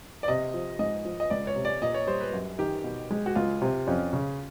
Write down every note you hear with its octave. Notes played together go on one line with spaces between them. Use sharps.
D5
C3 D#5
F3
G#2 D#5
F3
D#5
C#2 D5
C#5
C3
D5
A#2 D#5
C#5
G3 C5
B4
F#2
D#3 G4
B2
G#3
F#4
C#2 F4
C3
F2 C#4
C#3